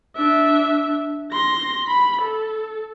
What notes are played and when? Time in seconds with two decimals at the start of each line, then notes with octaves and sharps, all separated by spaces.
0.17 D4 E5
1.33 C6 A#6
1.88 B5
2.22 A4